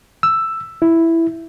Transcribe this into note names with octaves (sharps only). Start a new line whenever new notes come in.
E6
E4